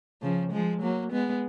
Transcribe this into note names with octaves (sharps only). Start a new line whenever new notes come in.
C#3 F3
F3 G#3
F#3 A#3
G#3 B3